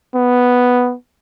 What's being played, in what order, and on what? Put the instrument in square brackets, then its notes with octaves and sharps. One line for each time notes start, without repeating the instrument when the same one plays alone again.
[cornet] B3